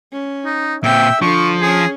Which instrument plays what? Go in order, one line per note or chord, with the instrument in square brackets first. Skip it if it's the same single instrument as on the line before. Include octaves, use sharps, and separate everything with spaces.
[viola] C#4
[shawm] D#4
[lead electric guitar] A#2 C4 [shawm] E5 [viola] G5
[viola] D3 D4 [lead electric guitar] F3 [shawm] C#6
[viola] C#4 [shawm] G#4